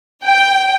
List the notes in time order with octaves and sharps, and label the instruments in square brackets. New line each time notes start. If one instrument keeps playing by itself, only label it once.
[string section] G5